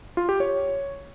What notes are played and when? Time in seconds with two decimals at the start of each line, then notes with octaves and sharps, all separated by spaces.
0.17 F4
0.29 G4
0.40 C#5